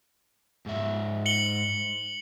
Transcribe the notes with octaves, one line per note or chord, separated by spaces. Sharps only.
G#2 E5
C#7 F#7 G7